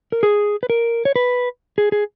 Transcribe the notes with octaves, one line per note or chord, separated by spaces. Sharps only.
A#4
G#4
B4
A#4
C#5
B4
G#4
G#4